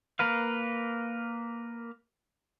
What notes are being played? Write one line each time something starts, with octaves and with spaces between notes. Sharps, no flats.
A#3 A#4 B4 F5